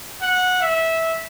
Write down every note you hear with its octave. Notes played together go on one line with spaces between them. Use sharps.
F#5
E5